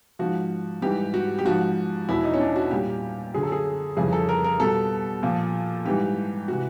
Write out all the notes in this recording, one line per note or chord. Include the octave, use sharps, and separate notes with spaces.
G#2 F3 F#4
G#2 E3 G3 G4
F#4
G4
G#2 F3 F#4
E2 B2 F#3 E4
D#4
C#4
D4
F#4
A#2 G3 G4
F#2 D3 F#3 G#4
A4
G#4
F2 C#3 E3 G3 G#4
A4
A#4
A#4
B2 G3 A4
A#2 F3
G#2 E3 G3 G4
C3 E3 F#4